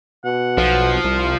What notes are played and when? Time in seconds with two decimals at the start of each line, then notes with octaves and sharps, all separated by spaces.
0.25 B2 F#5
0.57 B1 F3
1.04 C2